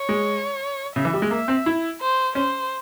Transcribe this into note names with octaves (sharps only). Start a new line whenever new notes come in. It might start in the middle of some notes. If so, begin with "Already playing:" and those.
Already playing: C#5
G#3
C#3 E5
E3
G3
G#3
A#3 E5
C4
E4
C5
C#4 C5